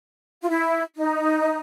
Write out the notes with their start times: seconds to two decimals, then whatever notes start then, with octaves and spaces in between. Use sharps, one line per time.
0.42 F4
0.49 E4
0.96 D#4